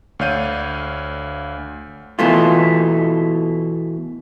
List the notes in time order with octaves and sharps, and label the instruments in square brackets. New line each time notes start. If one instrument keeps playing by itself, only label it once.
[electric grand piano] D2 C#5 D5 F5 G6 D#7
[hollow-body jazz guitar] B2 E3 A3 F4